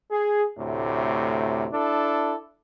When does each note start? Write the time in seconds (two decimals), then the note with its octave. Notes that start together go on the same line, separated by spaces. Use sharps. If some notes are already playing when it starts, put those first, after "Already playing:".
0.11 G#4
0.59 D2 A2 C3
1.72 D4 E4 A4